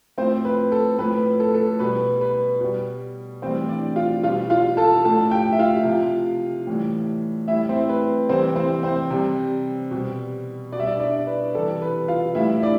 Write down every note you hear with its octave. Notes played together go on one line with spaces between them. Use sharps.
A2 F3 C4 C5
B4
A4
A2 F3 B4
A4
A4
B2 G3 B4
B4
B2 G3
A2 E3 G3 C4 C5
D4 D5
F4 F5
B2 G3 F4 F5
F4 F5
A4 A5
A2 F3 A4 A5
G4 G5
E5
F4 F5
C3 F3
A2 E3 G3
A2 G3 E4 E5
C4 C5
B4
C3 E3 G3 C4 C5
C4 C5
C4 C5
C3 G3
B2 G3
B2 D5
G3 E5
D4 D5
D4 D5
B4
C3 E3 G3 A4
B4
F4 F5
A2 G3 E4 E5
D4 D5